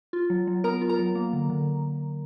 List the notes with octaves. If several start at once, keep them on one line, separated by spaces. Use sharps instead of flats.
F4
F#3
F#3
B3 A#4 A#5
F4
A#4 A#5
F#3
A#3
D3
D3